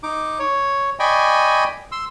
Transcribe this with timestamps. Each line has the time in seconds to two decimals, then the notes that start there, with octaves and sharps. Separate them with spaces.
0.03 D#4 D6
0.39 C#5
1.00 D5 D#5 G5 G#5 B5 C#6
1.92 C6 E6